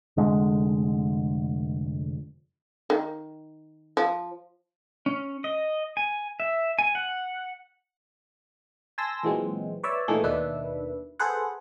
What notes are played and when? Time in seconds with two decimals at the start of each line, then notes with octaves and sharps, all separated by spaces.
0.17 F1 D3 G#3
2.90 D#3
3.97 F3
5.06 C#4
5.44 D#5
5.97 G#5
6.40 E5
6.79 G#5
6.95 F#5
8.98 G#5 A5 C6 E6 A#6
9.23 A#2 E3 F#3 G#3 C4
9.83 B4 C#5 D5 E5
10.08 A#2 D#3 E3 A3 A#3 G#4
10.23 D#2 B2 D#3 D4 B4 E5
11.19 G#4 A4 B4 C5 F#5